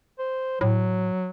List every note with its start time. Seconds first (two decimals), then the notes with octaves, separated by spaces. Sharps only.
0.19 C5
0.61 A2 F#3